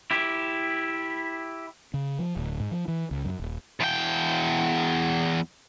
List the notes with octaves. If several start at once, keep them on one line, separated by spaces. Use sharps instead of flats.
E4 G4
C#3
F3
D1
G#2
F3
E3
C#2
F#2
D#1
E2 G5